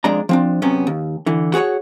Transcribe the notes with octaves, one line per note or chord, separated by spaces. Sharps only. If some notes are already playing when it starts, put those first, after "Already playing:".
F2 G#3 D4 D5 A#5
F3 C4 D4
F#2 C3 B3 C#4
D#2
D3 E3
F#4 G#4 A#4 C#5 F#5